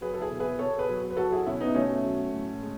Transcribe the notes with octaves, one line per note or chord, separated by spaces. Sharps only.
F#3 G#4 B4
A4
E4 G#4
B2
G#4 B4
B2 A4 C#5
G#4 B4
F#3
B4
F#3 F#4 A4
E4 G#4
B2 C#4 E4
B3 D#4
B2 A3 C#4
F#3
A2
G#3